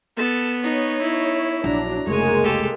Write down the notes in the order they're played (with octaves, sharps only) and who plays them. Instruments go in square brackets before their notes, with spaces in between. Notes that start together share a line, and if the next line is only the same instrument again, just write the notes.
[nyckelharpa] B3 [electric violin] A4 A5
[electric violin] D#4 [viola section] C#5
[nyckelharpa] E4
[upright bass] A#1 [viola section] F#3 D4 [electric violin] A#5
[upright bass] F1 C#2 [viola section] G#3 A#3 [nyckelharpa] C#5 G#5
[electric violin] G4 A4